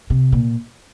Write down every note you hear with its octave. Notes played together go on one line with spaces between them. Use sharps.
C3
A#2